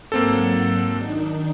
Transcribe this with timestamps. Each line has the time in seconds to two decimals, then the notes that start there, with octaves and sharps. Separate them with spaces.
0.12 G#2 F#3 A#3 C4 A4 F#5
0.85 D#3 D4 D#4